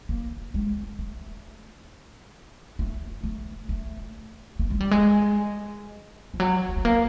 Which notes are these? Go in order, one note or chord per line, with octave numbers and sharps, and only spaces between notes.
A#3
G#3
A3
A3
A3
A3
A3
G#3
G3
G#3
F3
F#3
G#3
A3
A#3